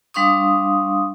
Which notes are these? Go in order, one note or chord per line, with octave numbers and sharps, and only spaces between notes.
G3 D4 F5 C6 C#6 D#6